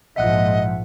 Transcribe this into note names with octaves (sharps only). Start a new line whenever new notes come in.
A#1 G#2 F3 D#5 E5 F#5 F#6